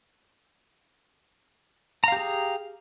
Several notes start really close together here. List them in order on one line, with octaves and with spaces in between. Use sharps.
A#5 F5 G4 G#4